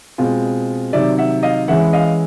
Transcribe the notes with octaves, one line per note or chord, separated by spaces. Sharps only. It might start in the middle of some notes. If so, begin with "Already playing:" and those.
B2 G#3 C4 F4
C3 D#3 F#3 D5 E5
E5 F#5
D#5 F5
E3 G#3 C#4 E4 E5 F#5
D#5 F5